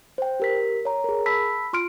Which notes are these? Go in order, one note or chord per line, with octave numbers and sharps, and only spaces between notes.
C5 G5
G4 A#4 B6
C#5 A#5
G#4 A#4
A5 B5 E6 B6
F4 C6 F6 D7